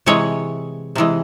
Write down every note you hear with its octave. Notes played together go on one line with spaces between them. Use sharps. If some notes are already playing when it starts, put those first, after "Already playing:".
C3 E3 G#3 C#5
C3 E3 G#3